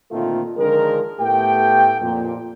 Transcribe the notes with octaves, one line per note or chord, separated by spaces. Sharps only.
A#2 D3 D#3 A3 C4 F4
D3 D#3 F3 G#3 D4 A#4
A2 A3 B3 G4 G5
F2 A#2